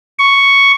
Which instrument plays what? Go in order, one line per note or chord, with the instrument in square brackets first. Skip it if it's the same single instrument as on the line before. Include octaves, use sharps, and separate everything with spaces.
[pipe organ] C#6